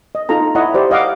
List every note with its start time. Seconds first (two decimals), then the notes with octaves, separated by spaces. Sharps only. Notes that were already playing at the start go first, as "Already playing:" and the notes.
0.15 D#5
0.29 D#4 F4 A4 A#5
0.55 E4 C#5 D#5 E5 F#5
0.74 G4 C5 D5
0.91 D#5 F5 F#5 D6